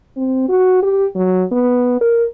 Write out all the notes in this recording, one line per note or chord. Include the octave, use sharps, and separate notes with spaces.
C4
F#4
G4
F#3
B3
A#4